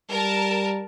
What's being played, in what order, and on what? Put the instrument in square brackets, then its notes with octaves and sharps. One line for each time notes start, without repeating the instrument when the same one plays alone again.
[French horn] G3 [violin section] A#4 A5